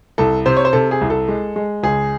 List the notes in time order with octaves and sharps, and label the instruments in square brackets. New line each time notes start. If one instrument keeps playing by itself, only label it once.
[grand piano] C2 A4
C3 C5
C#5
C5
C3 A4
G#4
C2
A4
G#3
G#3
C#2 G#4